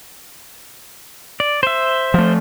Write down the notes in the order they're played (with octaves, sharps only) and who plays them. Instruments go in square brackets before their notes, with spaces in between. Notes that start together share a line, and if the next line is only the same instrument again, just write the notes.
[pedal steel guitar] D5
C5 E5
[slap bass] F3 A3